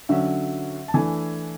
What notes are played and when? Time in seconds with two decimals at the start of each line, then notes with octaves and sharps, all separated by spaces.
0.09 D3 F#3 C#4 E5
0.88 A5
0.94 E3 A3 D4 G#5